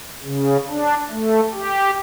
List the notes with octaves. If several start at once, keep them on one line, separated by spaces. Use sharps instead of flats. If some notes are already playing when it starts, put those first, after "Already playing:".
C#3
D4
A3
G4